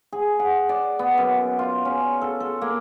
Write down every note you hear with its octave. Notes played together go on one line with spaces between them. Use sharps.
G#4
F#5
D5
B3
F#2
F4
C#4
A4
A4
A#3